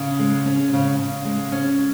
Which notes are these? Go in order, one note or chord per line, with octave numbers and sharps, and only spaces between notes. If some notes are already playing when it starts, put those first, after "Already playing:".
Already playing: C#3
G#3
C#4
C#3
C#3
G#3
C#4